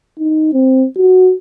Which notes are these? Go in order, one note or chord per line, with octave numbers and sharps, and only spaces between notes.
D#4
C4
F#4